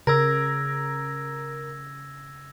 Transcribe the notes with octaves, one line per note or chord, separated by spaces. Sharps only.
C#3 A#4 E6 G#6 A#6